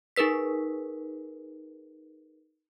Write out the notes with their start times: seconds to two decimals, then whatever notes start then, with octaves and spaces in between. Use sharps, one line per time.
0.16 D#4 G#4 A#4 B4 B6